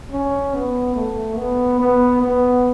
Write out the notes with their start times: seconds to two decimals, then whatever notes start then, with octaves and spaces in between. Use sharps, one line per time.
0.12 C#4
0.54 B3
0.95 A3
1.37 B3
1.80 B3
2.22 B3